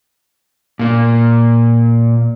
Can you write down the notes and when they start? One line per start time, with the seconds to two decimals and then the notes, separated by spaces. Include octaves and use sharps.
0.79 A#2 A#3